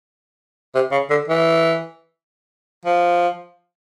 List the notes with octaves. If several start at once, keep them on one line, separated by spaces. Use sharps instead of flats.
C3
C#3
D3
E3
F3